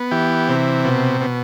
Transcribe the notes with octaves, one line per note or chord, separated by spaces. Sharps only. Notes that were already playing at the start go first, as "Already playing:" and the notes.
Already playing: B3
E3 G4
C3
B2
B2